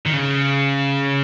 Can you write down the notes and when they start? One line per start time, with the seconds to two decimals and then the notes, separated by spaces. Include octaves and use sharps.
0.06 D#3
0.13 C#3